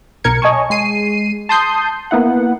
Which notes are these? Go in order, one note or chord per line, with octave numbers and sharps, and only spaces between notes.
B1 A#4 G#6 C#7
C#5 D#5 G#5 A5 C#6
G#3 C7 D#7
A5 C6 D#6 G6 C7
A#3 B3 E4 F#5